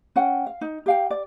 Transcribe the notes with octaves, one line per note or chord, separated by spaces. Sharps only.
C#4 F#5 G5
F5
D#4
G4 F5 G5
D5